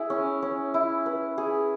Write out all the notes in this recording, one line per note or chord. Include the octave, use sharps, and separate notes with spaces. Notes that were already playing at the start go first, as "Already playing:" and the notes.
Already playing: E4 G#4
C#4
C#4
E4
B4
G#4